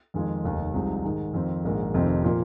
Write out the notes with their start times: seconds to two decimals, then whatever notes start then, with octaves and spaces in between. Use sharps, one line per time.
0.14 F2 D#3 G#3 F4 G#4
0.44 F1 D#2 D#3
0.73 C2 C3 F3 G#3 D#4
1.05 G#2 D#3 G#3
1.34 F2 D#3 C4
1.64 A#1 G#2 D#3 A#3
1.94 F1 F2 C3 D#3 C4
2.24 A#2 F3 A#3